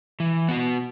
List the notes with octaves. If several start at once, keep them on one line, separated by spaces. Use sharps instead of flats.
E3
B3 F#4